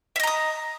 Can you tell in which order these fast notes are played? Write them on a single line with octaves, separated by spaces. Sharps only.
E5 D#5 A#5 D#6